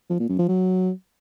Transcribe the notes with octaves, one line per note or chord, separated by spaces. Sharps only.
F3
A#2
F#2
F3
F#3